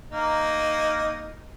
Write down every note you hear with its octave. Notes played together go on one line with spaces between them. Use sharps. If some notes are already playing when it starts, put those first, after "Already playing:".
A#3 D#4